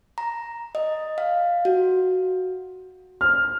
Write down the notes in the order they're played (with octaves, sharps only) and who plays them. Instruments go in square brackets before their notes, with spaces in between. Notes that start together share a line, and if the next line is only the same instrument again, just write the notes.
[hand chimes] A#5
D#5
F5
F#4
[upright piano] F6